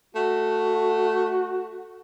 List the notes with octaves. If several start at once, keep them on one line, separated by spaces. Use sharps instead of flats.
A3 F#4